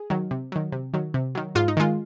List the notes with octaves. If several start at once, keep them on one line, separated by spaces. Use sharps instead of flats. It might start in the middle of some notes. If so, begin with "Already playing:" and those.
Already playing: G#4
D#3 F#3
C3
D#3 F#3
C3
D#3 F#3
C3
D#3 F#3
G#2 F4
D#4
D#3 G#3 F4